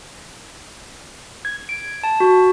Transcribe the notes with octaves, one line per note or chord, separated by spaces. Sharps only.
G#6
D7
A5
F#4